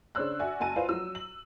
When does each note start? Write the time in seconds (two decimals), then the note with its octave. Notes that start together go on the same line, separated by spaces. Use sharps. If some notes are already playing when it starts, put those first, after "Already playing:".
0.15 C#3 D4 C5 C#5 E6 F#6
0.39 F#4 D5 E5 F#5 G#5
0.60 F#1 F#4 G#5 A5 D#7
0.76 F4 B4 C5 D5 F5 F#5
0.89 F3 F#3 E6
1.15 F#7